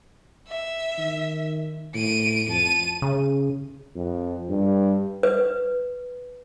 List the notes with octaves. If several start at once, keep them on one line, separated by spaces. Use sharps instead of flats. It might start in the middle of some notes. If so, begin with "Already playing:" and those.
E5
D#3
A2 D7 D#7
F2 A5 D#7
C#3
F2
G2
B4